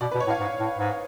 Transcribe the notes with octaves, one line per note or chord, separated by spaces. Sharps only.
B2 D5
B4
B2
C#5
A2
F5
G#2
A2
G#2